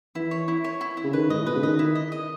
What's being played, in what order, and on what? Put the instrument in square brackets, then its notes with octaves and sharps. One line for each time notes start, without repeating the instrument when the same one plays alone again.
[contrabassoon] E3 [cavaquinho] E4
[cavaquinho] C#5
E4
C#5
E4
E4
[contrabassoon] C#3
[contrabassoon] D#3 [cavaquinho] B4
[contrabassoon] G#2 [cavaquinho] D#5
[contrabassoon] A2
[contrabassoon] B2 [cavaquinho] B4
[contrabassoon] C#3
[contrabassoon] D#3 [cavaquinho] D#5
[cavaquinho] E4
D#5
D#5